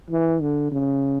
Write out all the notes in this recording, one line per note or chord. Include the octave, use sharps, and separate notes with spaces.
E3
D3
C#3